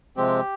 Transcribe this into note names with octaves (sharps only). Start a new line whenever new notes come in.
C3 F3 G#3 C4 G4